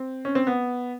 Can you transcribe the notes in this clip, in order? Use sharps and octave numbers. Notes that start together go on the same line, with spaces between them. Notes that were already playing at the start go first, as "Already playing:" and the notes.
Already playing: C4
C#4
C4
B3